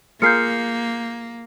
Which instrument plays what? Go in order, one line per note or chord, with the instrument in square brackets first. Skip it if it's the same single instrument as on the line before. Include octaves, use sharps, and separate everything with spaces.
[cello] A#3 [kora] F4 G#4 A#4 [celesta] G6 C7 C#7